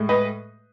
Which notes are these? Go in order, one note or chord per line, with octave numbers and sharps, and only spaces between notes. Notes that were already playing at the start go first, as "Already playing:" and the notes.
Already playing: A2 G#3
B4 D#5